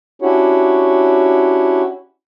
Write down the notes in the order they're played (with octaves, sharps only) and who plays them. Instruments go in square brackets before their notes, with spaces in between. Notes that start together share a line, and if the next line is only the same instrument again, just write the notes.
[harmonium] C#4 D4 E4 F#4 G4 C#5